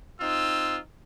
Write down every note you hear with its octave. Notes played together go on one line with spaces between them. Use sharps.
C4 D#4 F4 E6